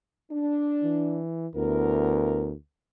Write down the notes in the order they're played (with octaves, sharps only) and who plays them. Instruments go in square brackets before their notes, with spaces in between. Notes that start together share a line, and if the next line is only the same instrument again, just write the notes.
[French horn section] D4
[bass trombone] E3
[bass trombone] D2 [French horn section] B3 E4 A#4